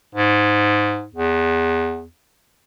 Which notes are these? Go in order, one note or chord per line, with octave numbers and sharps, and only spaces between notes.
G#2
E2